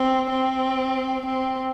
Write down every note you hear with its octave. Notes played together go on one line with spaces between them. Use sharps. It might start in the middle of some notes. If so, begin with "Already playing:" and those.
Already playing: C4
C4
C4